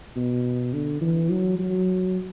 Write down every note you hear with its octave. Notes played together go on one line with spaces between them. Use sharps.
B2
D3
E3
F#3
F#3